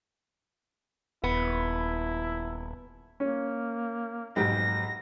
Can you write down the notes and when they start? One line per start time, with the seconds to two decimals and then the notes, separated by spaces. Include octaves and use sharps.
1.24 D#1 B3 E4
3.20 A#3 C#4
4.36 B1 F2 G#2 G4 A#6